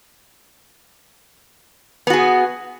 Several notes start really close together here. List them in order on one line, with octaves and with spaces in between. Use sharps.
B3 F#4 G#4